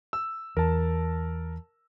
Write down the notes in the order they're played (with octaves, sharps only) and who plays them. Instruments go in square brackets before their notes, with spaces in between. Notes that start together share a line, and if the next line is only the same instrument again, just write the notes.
[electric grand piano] E6
[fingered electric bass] E2 [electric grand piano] A#4 A5